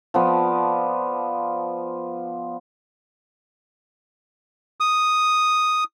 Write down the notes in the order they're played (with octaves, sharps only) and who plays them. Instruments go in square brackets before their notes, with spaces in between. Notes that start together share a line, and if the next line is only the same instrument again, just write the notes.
[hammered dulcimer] F3 B3 D5
[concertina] D#6